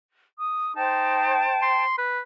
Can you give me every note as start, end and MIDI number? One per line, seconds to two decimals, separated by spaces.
0.40 0.73 87
0.76 1.42 63
0.76 1.83 72
0.76 1.83 79
0.76 1.83 81
1.62 1.97 84
1.98 2.20 71